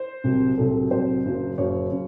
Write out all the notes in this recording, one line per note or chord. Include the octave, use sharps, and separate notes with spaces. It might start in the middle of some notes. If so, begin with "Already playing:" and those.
Already playing: C5
C2 C3 F#3
C2 C3 F#3 A4
C2 C3 F#3 C5
F#1 F#2 C#3 F#3
F#1 F#2 C#3 F#3 C#5
C#3 F#3